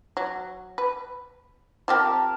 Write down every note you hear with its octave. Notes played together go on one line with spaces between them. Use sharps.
F#3
B4
F3 C4 G4 A#4 A5